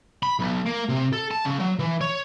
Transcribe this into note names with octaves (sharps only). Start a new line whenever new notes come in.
B5
B1
A#3
C3
A4
A5
C#3
F#3
E3
C#5